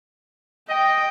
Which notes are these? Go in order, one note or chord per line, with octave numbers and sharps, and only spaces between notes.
D#5 G5